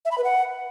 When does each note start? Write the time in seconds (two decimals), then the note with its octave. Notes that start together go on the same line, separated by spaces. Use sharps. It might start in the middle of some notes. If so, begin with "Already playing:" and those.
0.05 E5
0.11 B5
0.18 B4
0.24 F#5